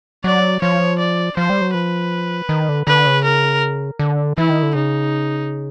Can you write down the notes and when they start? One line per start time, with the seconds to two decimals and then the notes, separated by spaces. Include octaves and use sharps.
0.24 F#3 D5
0.62 F3 C#5
0.99 D5
1.37 F3 C5
1.50 G3
1.61 F#3
1.74 F3 B4
2.49 D#3
2.69 D3
2.87 D3 B4
3.06 C#3
3.24 A#4
3.99 D3
4.38 E3 E4
4.50 D#3
4.63 D3
4.75 C#3 D#4